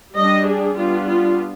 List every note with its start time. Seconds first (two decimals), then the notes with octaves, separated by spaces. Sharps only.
0.16 G3 D4 D#5
0.46 G#4
0.76 G3 B3 D4 F4
1.07 F4